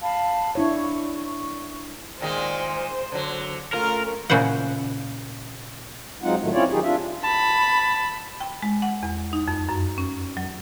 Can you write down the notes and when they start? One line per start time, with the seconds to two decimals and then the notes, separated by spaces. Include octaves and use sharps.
0.02 F5 A5 B5
0.55 D4 E4 C#5 C#6
2.21 A#2 D#3 G#3 C5
3.12 D3 F#3
3.74 A3 C#4 F4 A#4
4.30 A#2 C#3 E4 C5 F#5
6.23 F#3 G#3 C4 D#4 F4 F#5
6.40 A2 D#3 F#3 A3
6.53 C4 C#4 E4 F4 C#5 D5
6.71 D#3 F#3 D#4 G4 G#4
6.83 D4 F4 E5
7.24 A5 B5
8.40 G5
8.62 G#3
8.82 F#5
9.03 E2
9.33 D#4
9.48 F2
9.69 F#2
9.98 C#4
10.37 F#3